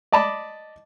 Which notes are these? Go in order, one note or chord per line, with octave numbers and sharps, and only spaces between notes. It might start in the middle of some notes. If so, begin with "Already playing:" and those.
D5 D#5 A5 B5 D6